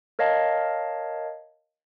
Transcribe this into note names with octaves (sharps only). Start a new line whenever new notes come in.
A#4 C#5 D#5 F5 A5